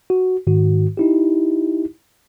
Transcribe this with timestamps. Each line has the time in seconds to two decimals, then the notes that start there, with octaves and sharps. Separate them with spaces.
0.10 F#4
0.47 G#2 D#3 F#4
0.97 D#4 E4 G4